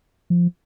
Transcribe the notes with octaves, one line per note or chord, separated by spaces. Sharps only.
F3